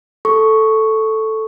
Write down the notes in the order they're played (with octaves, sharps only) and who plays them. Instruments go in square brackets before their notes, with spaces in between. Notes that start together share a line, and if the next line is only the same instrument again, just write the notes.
[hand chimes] A4 C#6